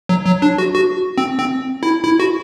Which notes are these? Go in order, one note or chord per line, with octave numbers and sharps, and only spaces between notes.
F#3
F#3
D4
F#4
F#4
C4
C4
E4
E4
F#4